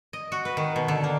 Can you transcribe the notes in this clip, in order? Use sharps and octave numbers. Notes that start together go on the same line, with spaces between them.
D#5
F#4
B4
D#3
B2
D3
A#3